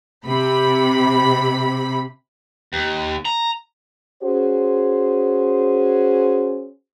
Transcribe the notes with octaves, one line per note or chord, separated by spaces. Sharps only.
C3 B5
D#2
A#5
C#4 F#4 G#4 C5